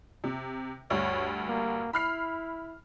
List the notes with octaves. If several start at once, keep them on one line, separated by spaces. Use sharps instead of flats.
C3
D2 G2 C#5
A#3
E4 B5 F6 C7